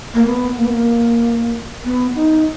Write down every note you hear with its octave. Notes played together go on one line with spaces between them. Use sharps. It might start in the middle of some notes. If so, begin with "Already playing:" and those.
A#3
B3
A#3
B3
A#3
B3
D#4